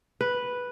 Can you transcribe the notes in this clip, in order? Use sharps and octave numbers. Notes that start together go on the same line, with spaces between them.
B4